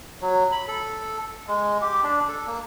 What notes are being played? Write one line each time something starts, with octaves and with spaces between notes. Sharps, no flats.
F#3
B5
A4
G#3
G4
D4
A4
A#3